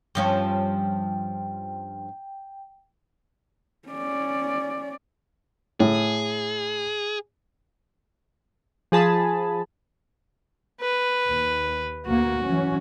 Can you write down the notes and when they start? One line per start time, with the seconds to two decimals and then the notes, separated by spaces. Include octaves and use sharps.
0.15 G2 F3 C#4 G5
3.88 C#4 D5
5.80 A2 G#4
8.92 F3 G#4 A5 B5
10.80 B4
11.28 D#2
12.06 D2 A#3 F#4
12.45 E3 F#3 C#4